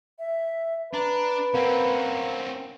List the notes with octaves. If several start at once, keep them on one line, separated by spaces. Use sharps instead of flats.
E5
D4 B4 A#5
A#3 C4 C#4 F#5